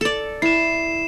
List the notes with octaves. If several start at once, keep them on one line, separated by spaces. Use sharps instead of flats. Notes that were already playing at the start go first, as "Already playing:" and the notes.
A4 D5
E4 C7 E7